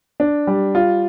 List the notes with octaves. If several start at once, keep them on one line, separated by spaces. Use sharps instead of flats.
D4
G3
F4